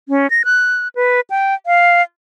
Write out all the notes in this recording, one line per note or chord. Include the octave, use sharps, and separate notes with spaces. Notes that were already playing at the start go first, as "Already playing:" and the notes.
C#4
A#6
F#6
B4
G5
F5